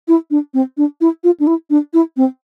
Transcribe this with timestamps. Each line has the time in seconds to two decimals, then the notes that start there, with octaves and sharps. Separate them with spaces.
0.08 E4
0.31 D4
0.54 C4
0.77 D4
1.01 E4
1.24 F4
1.40 D4
1.47 E4
1.70 D4
1.94 E4
2.17 C4